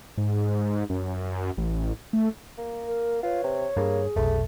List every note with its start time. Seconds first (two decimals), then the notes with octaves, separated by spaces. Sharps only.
0.17 G#2
0.90 F#2
1.58 A1
2.13 A3
2.58 A#3
2.87 A#4
3.23 F4 B4 C#5
3.44 C3
3.77 G2 A#3 G#4
4.16 F1 B1 A3